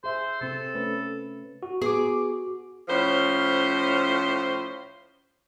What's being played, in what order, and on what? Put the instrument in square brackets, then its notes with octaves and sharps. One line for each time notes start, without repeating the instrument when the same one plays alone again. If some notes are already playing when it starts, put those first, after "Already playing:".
[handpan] G#4 E5 [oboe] C5
[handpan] C3 C4 [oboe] A4
[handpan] A3 C#4 B4
[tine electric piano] F#4
[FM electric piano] B3 D6 [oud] G#4
[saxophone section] A2 F3 C#4 C5